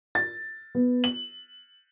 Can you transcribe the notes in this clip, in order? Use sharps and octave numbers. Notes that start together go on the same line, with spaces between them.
A6
B3
F#7